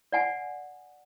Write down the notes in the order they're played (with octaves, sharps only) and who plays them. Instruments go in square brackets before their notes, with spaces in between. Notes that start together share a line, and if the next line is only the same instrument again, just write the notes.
[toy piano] D5 F#5 G#5